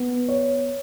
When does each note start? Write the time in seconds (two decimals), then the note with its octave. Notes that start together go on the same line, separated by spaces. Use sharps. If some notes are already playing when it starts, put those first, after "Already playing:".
Already playing: B3
0.28 C#5